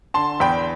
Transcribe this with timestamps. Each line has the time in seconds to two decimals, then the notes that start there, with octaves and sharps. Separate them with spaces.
0.14 D3 A5 C6
0.40 E2 G5 B5